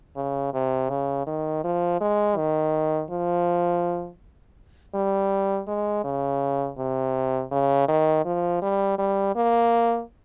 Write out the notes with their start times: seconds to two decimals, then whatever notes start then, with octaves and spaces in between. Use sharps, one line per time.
0.16 C#3
0.53 C3
0.89 C#3
1.27 D#3
1.64 F3
2.01 G#3
2.37 D#3
3.11 F3
4.95 G3
5.68 G#3
6.04 C#3
6.78 C3
7.51 C#3
7.88 D#3
8.25 F3
8.62 G3
8.99 G3
9.36 A#3